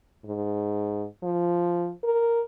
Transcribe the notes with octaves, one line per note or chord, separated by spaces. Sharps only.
G#2
F3
A#4